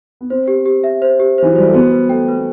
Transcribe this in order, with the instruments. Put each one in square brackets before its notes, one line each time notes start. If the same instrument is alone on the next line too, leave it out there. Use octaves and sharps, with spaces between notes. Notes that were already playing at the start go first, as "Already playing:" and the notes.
[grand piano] B3
[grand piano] C4 [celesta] C5
[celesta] G4
G4
E5
C5
G4
[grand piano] E3 [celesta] C5
[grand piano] F#3
[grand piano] G3 [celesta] C5
[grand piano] A3
[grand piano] B3 [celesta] F#4
[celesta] B4
[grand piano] A3 [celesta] G5
[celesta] B4
[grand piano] B3